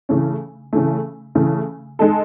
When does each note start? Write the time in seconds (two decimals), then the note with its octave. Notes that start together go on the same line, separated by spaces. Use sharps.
0.09 C#3 E3 A3 C#4
0.73 C#3 E3 A3
1.35 C#3 E3 A3
1.99 G#3 D#4 A4